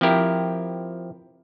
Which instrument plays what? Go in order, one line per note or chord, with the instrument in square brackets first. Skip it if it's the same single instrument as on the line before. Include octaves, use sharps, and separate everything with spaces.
[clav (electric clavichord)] F3 C4 E4 G4 A#4